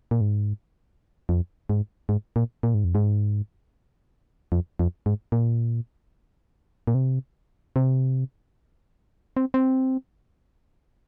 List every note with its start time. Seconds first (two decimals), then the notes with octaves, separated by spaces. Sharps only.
0.11 A#2
0.21 G#2
1.29 F2
1.70 G#2
2.09 G#2
2.36 A#2
2.63 A#2
2.74 G#2
2.84 F2
2.95 G#2
4.52 F2
4.79 F2
5.06 G#2
5.32 A#2
6.87 A#2
6.95 C3
7.76 C3
9.37 C4
9.54 C4